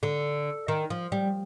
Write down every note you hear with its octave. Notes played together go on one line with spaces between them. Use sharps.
D3
D#3
F3
G3